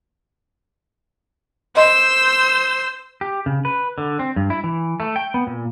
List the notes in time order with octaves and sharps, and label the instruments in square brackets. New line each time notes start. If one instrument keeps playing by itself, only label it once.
[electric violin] C5 [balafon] D#5 C6 [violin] E6
[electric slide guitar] G4
C#3
B4
D3
C4
G2
E4
E3
A3
G5
B3
A#2